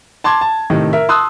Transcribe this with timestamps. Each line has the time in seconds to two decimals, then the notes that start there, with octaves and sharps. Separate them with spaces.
0.24 A5 C6 D6 G#6
0.41 A5
0.70 A2 C3 D#3
0.93 A#4 E5
1.09 A5 C6 D#6 E6 F#6